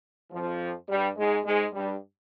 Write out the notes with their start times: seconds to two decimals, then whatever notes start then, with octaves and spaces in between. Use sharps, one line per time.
0.32 F2 F3
0.89 G2 G3
1.17 G#2 G#3
1.45 G#2 G#3
1.73 G2 G3